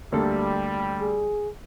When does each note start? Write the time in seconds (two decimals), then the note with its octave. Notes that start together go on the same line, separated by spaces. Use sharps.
0.12 D2 G3 A#3 A4
1.01 G#4